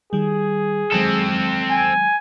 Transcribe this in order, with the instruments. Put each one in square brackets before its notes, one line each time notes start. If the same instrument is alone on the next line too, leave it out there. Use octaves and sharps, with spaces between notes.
[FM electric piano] D#3 G3 [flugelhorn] G#4
[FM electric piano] D#3 F#3 G#3 [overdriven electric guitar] C4 A4
[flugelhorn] G#5